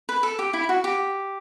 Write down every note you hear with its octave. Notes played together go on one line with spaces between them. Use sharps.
B4
A4
G4
E4
F#4
G4